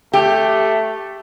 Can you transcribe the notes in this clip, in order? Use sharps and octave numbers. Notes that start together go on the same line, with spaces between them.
A3 G4